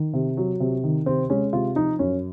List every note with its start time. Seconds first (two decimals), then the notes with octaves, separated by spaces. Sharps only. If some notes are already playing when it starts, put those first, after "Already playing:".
Already playing: D#3
0.13 C3
0.37 F#3
0.60 C3
0.84 D#3
1.06 C3 C4
1.30 G#3 C#4
1.53 C3 F4
1.76 F3 D#4
1.99 F#2 C#4